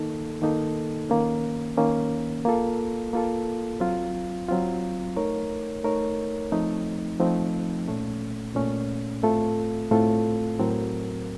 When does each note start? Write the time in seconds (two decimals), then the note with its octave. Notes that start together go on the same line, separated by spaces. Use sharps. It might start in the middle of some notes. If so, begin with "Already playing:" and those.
Already playing: D#3 A#3 D#4 A4
0.42 D#3 A#3 D#4 A4
1.10 D#3 A#3 C#4
1.77 D#3 A#3 C#4
2.45 A#3 F4 A4
3.13 A#3 F4 A4
3.80 F#3 C4 F4
4.49 F#3 C4 F4
5.16 A3 D#4 A#4 C#5
5.84 A3 D#4 A#4 C#5
6.52 F3 A3 C4 D#4
7.20 F3 A3 C4 D#4
7.88 A#2 A3 C#4
8.55 A#2 A3 C#4
9.23 A2 A3 C4 F4 A4
9.91 A2 A3 C4 F4 A4
10.59 A2 F#3 C4 F#4 A#4